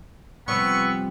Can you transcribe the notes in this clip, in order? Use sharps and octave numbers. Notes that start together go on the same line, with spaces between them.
C3 F3 G3 B3 C#6 E6